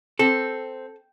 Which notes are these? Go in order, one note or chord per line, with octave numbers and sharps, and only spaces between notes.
C4 A4